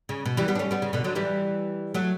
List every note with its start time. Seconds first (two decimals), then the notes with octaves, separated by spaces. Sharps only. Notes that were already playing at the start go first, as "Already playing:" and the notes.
0.09 C#3
0.25 B2
0.37 E3 G3
0.48 G3 B3
0.55 D4
0.59 A3 C#4
0.71 G3 B3
0.82 C#3
0.93 B2 D3
1.04 D3 F#3
1.15 E3 G3
1.94 F#3 A3